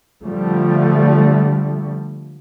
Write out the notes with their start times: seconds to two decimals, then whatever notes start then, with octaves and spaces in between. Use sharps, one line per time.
0.23 D3 F3 G3 A3